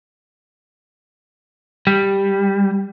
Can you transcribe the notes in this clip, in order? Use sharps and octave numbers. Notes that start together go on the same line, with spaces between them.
G3